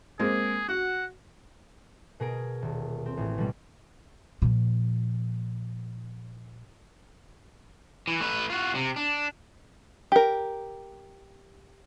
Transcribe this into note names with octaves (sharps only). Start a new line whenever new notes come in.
G#3 A#3 C4 G#4
F#4 F#5
B2 G#4 A#4 D7
D#1
C4
A1
B2 G3
A#2 F3
E3
A3 B4
F4 F#4
C3
D4
G4 A#4